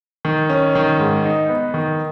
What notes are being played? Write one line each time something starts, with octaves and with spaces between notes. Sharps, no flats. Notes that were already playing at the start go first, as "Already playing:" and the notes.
D#3
C#4
D#3
G#2
D#4
B3
D#3